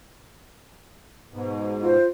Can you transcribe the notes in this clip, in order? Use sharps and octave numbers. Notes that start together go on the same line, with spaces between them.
G#2 B2
F4 C5